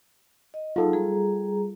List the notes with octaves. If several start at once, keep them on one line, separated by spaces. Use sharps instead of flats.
D#5
F#3 D#4 F4 G#4 A4
G3 G#4 A#5